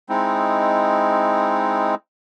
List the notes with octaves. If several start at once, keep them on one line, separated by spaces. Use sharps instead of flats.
G#3 C4 D#4 E4